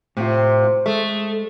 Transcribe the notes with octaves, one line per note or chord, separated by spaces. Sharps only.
A2 C3 F4
G#3 A3